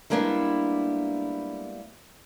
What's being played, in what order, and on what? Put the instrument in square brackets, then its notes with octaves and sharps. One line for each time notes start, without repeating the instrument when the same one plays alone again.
[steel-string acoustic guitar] G3 G#3 A#3 B3 D4 E4